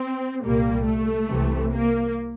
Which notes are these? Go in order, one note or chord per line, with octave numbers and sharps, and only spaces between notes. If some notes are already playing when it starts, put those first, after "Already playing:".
Already playing: C4
C2 A#2 G3 A#3
A3
C2 C3 E3
A#3